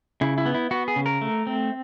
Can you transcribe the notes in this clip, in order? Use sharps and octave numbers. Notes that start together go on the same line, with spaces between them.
C#3 E4
E4
B3
E4
B3 F#4
G#4
C#3
A#4
A3
C4